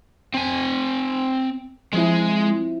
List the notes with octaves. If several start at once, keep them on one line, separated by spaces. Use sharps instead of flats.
C4 G#5
F3 G#3 C4 E4 G#4